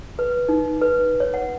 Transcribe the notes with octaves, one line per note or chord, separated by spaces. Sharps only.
B4
D#4
B4
C#5
F#5